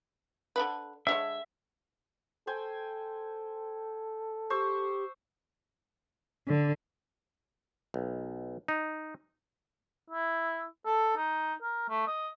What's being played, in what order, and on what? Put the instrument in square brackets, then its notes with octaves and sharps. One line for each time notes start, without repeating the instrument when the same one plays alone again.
[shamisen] D3 D#3 B4
[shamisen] D3 G#3 C#5 [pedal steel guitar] E5
[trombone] A4 [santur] C5 G5 G#5
[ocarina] G4 [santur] C5 C#6 E6
[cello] D3
[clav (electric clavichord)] B1
D#4
[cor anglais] E4
A4
D#4
A#4
A3
D#5